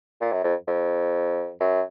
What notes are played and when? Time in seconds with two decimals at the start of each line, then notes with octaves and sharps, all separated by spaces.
0.21 A#2
0.32 F#2
0.44 F2
0.68 F2
1.60 F#2